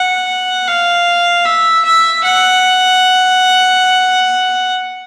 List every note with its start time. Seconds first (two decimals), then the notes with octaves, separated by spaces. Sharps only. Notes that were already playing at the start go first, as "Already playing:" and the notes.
Already playing: F#5
0.67 F5
1.45 E5
1.85 E5
2.24 F#5